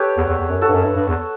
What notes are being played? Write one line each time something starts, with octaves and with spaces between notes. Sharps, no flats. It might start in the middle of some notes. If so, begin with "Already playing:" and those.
Already playing: G4 A4 B4 C#5
E2
E2
E2
F#2
F#4 A4
G2
F#2
G2
G2
E2